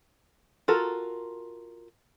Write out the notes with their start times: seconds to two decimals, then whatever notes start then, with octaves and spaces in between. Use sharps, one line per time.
0.68 F4 F#4 A4 A#4